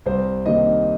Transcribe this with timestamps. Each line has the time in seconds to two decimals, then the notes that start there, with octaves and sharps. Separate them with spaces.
0.06 C2 C5
0.45 C3 D#3 A#3 D#5